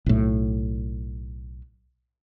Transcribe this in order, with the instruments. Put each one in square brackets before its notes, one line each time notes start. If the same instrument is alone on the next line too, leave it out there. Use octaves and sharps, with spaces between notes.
[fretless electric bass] B1 A2